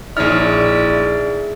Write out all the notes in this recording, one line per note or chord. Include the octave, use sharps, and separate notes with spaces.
A#1 D#4 E4 G#4 C#5 D5 F6